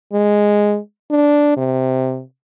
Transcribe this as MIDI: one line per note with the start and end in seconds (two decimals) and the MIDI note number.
0.13 0.78 56
1.10 1.55 62
1.57 2.22 48